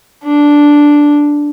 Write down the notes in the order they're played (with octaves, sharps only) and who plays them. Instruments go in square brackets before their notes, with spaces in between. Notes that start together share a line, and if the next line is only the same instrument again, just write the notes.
[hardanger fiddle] D4